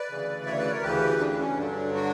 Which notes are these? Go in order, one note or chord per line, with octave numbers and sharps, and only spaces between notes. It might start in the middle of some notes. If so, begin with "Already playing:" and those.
Already playing: B4 D5
D2 C#3 E3
C#5 E5
B4 D5
A#4 C#5
D2 C#3 E3 G4 B4
D4
C#4
G2 D3 F#3 D4
D4 F#4